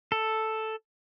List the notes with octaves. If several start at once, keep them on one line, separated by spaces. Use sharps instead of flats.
A4